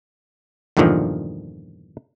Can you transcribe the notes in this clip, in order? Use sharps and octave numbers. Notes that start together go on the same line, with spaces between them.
E2 G2 A#2 D3 D#3 F3